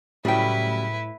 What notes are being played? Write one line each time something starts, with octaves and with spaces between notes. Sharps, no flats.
A2 C#3 F#3 G3 E4 G#4 B4 G5